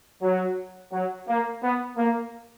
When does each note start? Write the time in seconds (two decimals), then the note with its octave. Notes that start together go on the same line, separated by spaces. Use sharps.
0.22 F#3
0.91 F#3
1.27 A#3
1.62 B3
1.97 A#3